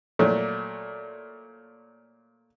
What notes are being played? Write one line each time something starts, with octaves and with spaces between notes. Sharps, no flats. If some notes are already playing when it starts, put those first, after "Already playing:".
A#2 F#3 A3